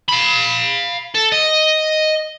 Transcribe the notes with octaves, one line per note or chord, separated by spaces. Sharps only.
F5 B5
A4
D#5